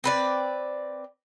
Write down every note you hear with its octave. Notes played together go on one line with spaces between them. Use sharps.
C4 B4 D5